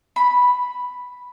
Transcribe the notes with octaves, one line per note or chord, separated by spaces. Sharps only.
B5